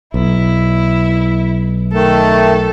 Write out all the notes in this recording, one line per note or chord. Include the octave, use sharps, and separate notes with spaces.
B1 E4
D#3 A3 A4